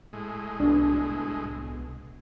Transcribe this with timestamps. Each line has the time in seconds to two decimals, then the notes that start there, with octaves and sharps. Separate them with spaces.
0.13 A2 G#3
0.60 C2 B2 D4